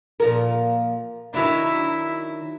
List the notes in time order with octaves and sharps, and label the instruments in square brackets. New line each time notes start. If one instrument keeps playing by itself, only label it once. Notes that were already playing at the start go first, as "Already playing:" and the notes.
[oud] A#2 F3 A#4
[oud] D#3 F#3 D4 [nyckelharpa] E4